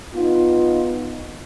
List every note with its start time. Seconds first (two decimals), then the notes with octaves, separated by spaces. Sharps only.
0.15 B3 D#4 F4